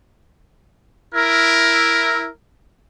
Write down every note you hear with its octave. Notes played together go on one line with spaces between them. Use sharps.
E4 A#4